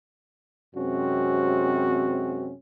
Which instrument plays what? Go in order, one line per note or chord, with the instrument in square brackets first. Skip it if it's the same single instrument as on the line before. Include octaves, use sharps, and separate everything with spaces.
[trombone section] F#2 C3 G#3 C4 C#4 F#4